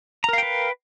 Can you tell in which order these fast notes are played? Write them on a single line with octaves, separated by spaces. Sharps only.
A#5 A#4 F5 G5 B4